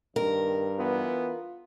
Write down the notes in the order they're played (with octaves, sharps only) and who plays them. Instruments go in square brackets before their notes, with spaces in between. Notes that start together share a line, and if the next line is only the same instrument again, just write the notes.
[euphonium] G2 [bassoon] D#3 [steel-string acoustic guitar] A#4
[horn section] E3 B3 [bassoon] F4